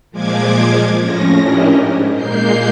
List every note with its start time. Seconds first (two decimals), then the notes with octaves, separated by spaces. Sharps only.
0.11 A#2 F3 G#3 D6 G#6
1.01 F2 A2 F3 C#4 A#6
1.42 C#4 D4 E4 G4 A#4 D#5
1.75 G#2
2.15 A#2 G#3 A#3 G6 C7